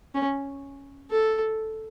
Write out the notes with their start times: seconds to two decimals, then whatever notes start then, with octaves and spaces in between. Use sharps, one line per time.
0.15 C#4
1.11 A4